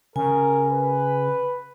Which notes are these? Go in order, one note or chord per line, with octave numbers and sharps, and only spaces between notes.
C#3 A#4 G#5
B4